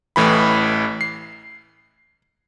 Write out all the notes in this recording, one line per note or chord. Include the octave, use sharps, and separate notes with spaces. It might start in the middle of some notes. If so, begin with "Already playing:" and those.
A1 A2 E3 B5
C7